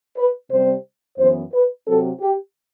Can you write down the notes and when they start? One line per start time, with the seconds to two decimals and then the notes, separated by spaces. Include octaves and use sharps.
0.17 B4
0.50 C3 G3 C4 C5
1.18 F#2 E3 B3 C5
1.53 B4
1.86 C3 F#3 C4 A4
2.21 G4